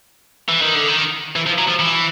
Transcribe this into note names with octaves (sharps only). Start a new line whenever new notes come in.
E3
D#3
D3
D#3
E3
F3
F#3
F3
E3